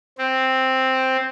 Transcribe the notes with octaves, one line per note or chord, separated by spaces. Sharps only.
C4